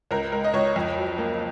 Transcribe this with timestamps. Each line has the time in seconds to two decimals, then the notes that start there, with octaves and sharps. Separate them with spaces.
0.11 C#2 A#4
0.32 G#3 A#4
0.44 D#5
0.53 C#2 C#5
0.76 F2
0.97 F#3
1.18 A#3